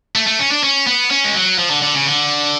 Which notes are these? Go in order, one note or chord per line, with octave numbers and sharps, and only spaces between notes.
A3
A3
C#4
D4
C#4
B3
C#4
G#3
F#3
F3
D3
D3
C#3
D3